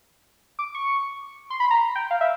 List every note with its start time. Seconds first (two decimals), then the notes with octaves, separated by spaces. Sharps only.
0.59 D6
0.74 C#6
1.50 C6
1.60 B5
1.71 A#5
1.95 G5
2.11 F5
2.21 E5